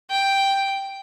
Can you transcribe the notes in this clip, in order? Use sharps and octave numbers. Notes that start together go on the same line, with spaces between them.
G5